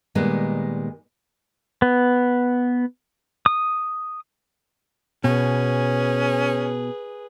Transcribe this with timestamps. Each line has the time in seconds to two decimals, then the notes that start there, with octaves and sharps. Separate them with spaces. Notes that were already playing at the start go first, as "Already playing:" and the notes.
0.15 A#2 D#3 G3 G#3 B3
1.82 B3
3.46 D#6
5.24 B2 C#4 G#4 B4